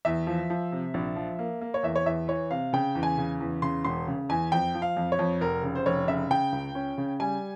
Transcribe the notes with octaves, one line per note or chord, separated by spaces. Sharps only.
E2 E5
F3
F3
C3
A#1
F3
A#3
A#3
C#5
E2 E5
C#5
E2 E5
E3 C#5
C3 F5
C#3 G5
E2
G#5
C#3
E2
C#3 C6
E1 C6
C#3
E2 G#5
F2 G5
F3
F5
F2
C#5
F2
F1 A#4
C#3
C5
F1 C#5
C#3 E5
C#3 G5
C#2
C#4
C#3
G3 G#5